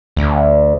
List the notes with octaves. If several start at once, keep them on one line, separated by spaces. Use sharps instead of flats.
D2